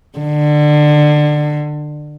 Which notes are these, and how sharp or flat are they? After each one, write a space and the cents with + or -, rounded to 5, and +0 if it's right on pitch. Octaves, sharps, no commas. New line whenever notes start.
D3 +25